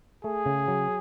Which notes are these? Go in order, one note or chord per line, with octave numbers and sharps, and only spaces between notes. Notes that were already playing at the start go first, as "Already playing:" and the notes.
A3 G#4
C#3
F#3